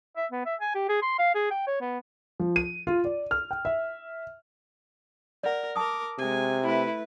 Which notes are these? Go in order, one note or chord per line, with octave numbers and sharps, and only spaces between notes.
E5
B3
E5
G#5
G4
G#4
C6
F5
G#4
G5
C#5
B3
F3
D#7
F4
D5
F6
G5
E5
A#4 D5 F#5
A#4 A5 D6 D#6
C3 G#3 G#5
A3 E4 B4